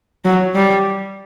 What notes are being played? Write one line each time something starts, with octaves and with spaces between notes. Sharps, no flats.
F#3
G3